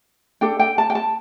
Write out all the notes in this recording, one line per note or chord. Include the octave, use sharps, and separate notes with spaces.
D4 A4 G5
G5
A5
G5
A5